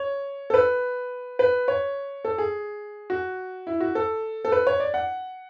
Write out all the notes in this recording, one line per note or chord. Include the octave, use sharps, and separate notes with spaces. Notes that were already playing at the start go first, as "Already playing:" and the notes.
Already playing: C#5
A4
B4
B4
C#5
A4
G#4
F#4
E4
F#4
A4
A4
B4
C#5
D5
F#5